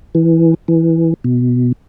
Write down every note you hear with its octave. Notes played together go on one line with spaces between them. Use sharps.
E3
E3
B2